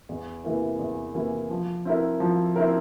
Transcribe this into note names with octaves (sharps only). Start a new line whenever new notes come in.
E2
C3 E3 A#3 E4
E2
C3 E3 A#3 E4
F3
C4 E4 A#4
F3
C4 E4 A#4